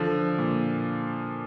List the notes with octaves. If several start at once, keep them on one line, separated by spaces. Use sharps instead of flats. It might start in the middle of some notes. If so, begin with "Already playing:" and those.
Already playing: D3 F3
A#2